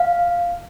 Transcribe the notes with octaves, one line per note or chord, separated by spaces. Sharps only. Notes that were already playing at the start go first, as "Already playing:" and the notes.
Already playing: F5